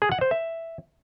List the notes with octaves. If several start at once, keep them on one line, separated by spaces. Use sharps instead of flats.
G#4
F#5
C5
E5